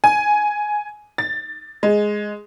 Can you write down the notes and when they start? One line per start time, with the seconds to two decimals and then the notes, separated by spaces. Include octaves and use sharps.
0.04 G#5
1.18 A6
1.83 G#3